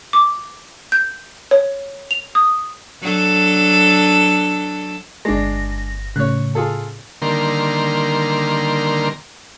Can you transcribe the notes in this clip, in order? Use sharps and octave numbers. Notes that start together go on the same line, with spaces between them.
D6
G6
C#5
F7
D#6
F#3 D4 A4
G1 G#3 D4 A#6
A2 C#3 C#5 F#6
F4 G#4 A4
D3 D#3 G3 A#3 A#4 C6